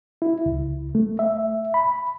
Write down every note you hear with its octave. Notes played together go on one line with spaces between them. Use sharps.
E4
C#2
A3
E5
B5